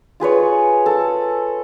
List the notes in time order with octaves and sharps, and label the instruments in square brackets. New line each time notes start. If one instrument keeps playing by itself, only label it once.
[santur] F4 G#4 B4 C#5
A4